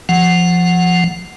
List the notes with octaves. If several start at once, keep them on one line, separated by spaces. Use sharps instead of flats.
F3 F#5